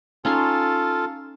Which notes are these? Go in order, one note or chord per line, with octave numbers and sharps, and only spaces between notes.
C#4 D#4 F4 A4 C6